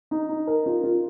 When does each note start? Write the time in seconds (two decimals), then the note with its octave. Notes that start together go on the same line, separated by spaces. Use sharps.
0.11 D#4
0.29 D#4
0.47 A#4
0.66 F4
0.84 F4